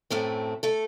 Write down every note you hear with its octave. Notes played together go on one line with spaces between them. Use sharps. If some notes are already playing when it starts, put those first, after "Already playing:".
F#2 A2 A3 C4
A3 A4